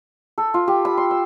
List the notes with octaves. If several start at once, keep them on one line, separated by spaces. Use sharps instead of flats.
A4
F4
G4
B5
C6
E6